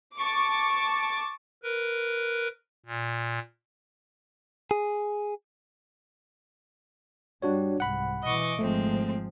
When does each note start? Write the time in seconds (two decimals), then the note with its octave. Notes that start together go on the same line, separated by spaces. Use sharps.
0.16 A5 C#6 D6
1.63 A#4 B4
2.86 A#2
4.71 G#4
7.42 G2 G3 D4 F#4 C#5
7.80 C2 G#2 F#5 B5
8.24 B2 E3 D#5 C#6 D6
8.59 G#1 F3 G#3 A3 C4